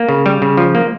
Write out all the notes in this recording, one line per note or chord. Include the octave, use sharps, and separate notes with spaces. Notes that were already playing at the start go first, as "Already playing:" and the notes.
Already playing: A#3
C#3
G3
C#3
F3
A#3